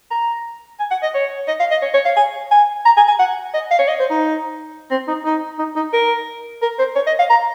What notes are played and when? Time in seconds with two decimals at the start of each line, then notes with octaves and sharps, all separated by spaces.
0.11 A#5
0.79 G#5
0.91 F#5
1.03 D#5
1.14 C#5
1.48 D#5
1.60 F5
1.71 D#5
1.82 C#5
1.94 C#5
2.05 F5
2.16 G#5
2.51 G#5
2.85 A#5
2.97 G#5
3.07 G#5
3.19 F#5
3.54 D#5
3.71 F5
3.79 C#5
3.88 D#5
4.00 C5
4.10 D#4
4.91 C4
5.08 D#4
5.25 D#4
5.59 D#4
5.76 D#4
5.93 A#4
6.62 A#4
6.79 C5
6.95 C#5
7.07 D#5
7.19 F5
7.30 A#5